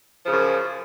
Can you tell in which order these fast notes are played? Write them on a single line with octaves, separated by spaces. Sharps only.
F3 C#3 F#2